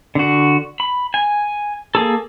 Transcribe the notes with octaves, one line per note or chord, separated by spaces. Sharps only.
D3 F#4
B5
G#5
A#3 G#4 A4